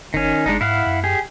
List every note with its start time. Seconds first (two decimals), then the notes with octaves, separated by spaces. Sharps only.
0.14 G1 D#3 C#4
0.46 G1 G#3 D4 D#4
0.61 G#2 E4 F5 F#5
0.87 F#2
1.04 G4 G#4